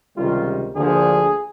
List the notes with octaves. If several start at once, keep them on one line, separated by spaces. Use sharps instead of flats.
C#2 C3 D#3 G3 F4
D2 D3 F3 A#3 G#4